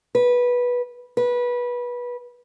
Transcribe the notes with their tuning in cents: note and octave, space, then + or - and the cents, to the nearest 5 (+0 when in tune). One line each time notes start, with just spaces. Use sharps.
B4 -15
B4 -20